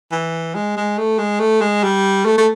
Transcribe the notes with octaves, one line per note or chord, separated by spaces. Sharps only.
E3
G#3
G#3
A3
G#3
A3
G#3
G3
A3
A3